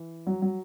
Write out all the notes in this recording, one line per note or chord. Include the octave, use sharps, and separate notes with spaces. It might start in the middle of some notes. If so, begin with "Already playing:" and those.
Already playing: E3
F#3
F#3